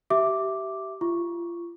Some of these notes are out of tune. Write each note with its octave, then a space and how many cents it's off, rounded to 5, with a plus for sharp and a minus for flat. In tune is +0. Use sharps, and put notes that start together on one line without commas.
G4 -30 E5 +0 D6 +0
F4 -30 C#6 +0